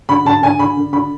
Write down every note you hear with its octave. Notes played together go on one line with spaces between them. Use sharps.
D3 B5
D3 A5
D3 G#5
D3 B5
D3
D3 B5